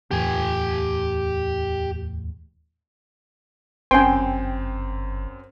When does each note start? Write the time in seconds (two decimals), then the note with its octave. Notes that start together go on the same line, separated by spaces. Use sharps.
0.11 D1 E2 A2 G4 G#5
3.91 G1 F#2 C4 G5 G#5 C6